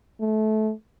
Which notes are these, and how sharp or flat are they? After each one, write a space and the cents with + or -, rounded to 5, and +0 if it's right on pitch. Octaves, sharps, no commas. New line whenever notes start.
A3 -25